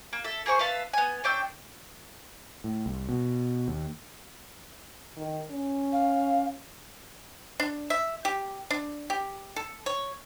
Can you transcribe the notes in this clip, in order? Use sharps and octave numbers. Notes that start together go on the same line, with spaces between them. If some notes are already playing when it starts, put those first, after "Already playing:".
A#3
A4 E5
A#3 G#4 C5 C#6
B4 E5 F5 A5
B3 G#5
C#4 D4 G5 E6
A2
C2
B2
D#2
D#3
C#4
F5
D4
E5
G4
D4
G4
A4
C#5